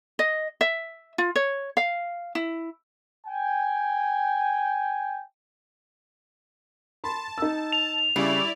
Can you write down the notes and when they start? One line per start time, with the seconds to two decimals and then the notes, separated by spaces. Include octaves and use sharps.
0.19 D#5
0.61 E5
1.18 F4
1.36 C#5
1.77 F5
2.35 E4
3.26 G5 G#5
7.04 A5 B5 C6
7.38 D#4 E6
7.72 F7
8.16 C#3 G3 E4 D5